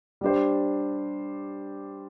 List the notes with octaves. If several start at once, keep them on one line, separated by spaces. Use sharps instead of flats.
G3 D4 G4 C5